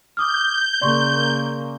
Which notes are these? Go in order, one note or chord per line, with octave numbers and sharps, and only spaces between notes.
D6 D#6 F6 G6
C#3 A#3 D5 C6 C#6